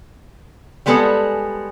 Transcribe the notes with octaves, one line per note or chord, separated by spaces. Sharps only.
G3 G#3 B3 G#4 A4